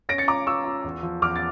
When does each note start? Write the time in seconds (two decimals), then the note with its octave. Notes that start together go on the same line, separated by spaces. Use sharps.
0.09 C#4 A#6 D7
0.18 A6 C#7
0.28 F4 A#5 D6
0.47 F4 C#6 E6
0.65 F4
0.84 E2
1.03 F3
1.22 E2 D6 F6
1.36 A6